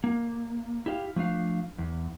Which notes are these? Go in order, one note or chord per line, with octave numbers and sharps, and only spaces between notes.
A#3
E4 G4 D#5 F5
F3 A3 D4 F5
E2